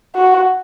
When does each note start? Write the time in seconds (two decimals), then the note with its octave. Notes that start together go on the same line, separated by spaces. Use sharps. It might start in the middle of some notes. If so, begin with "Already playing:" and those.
0.15 F#4